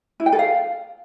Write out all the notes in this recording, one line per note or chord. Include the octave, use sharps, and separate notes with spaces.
E4
G5
A4
F5